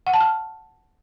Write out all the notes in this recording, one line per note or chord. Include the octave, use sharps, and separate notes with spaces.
F#5
A5
F6